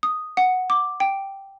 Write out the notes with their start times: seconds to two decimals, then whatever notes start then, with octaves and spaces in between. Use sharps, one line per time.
0.03 D#6
0.37 F#5
0.70 D6
1.00 G5